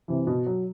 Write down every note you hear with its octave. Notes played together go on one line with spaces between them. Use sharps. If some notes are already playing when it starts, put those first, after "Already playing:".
C3 E3
B2
F#3